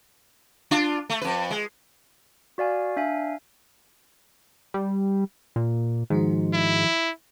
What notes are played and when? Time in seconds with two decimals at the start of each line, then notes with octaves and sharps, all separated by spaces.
0.71 D4 F4
1.10 A3
1.21 F2 B4
1.51 G#3
2.58 F#4 D5 F5 G#5
2.97 D4 E5 F5 G#5
4.74 G3
5.56 A#2
6.10 G#2 D#3 F3 F#4
6.54 E4